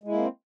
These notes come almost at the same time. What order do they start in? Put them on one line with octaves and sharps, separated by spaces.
G#3 E4 A#3 C4